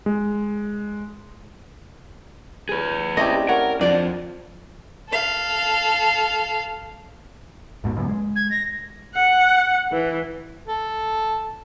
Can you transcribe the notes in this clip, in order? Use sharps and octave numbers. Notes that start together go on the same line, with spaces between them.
G#3
G#4 B4
A3 C4 C#4 E4 G4 D5 D#5
A#4 C#5 F#5
F2 D4 F4 D5 F#5
A4 F5
G#1 G#2 B2
C#2 F#2 A#2
G#3
G#6
A#6
F#5
E3
A4